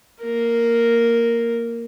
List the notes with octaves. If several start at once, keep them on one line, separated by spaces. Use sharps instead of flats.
A#3 A#4